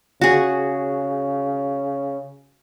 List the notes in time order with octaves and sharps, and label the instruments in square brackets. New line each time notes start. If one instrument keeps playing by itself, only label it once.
[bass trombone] C#3 [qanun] F#4 G#4